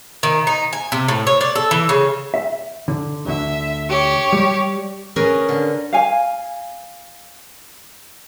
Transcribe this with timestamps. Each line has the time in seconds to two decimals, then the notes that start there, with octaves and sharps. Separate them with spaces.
0.23 D#3
0.47 D#4
0.73 G#5
0.92 C3
1.08 A2
1.27 C#5
1.41 D5
1.55 A4
1.71 E3
1.89 C#3
2.34 E5
2.88 D3
3.26 D2 D3 E5
3.89 G4 C#5
4.33 G3
5.16 C#4 G#4 A#4 B4
5.49 D3
5.93 F5 G#5